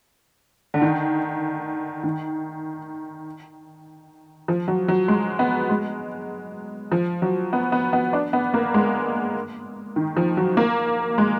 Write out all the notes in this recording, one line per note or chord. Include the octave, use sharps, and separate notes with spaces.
D3
D#3
D#3
F3
F#3
F#3
G#3
B3
G#3
F3
F#3
B3
B3
B3
D4
B3
A#3
G#3
D#3
F3
F#3
A#3
G#3